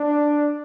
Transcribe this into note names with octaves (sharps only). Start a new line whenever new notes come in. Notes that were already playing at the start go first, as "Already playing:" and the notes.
Already playing: D4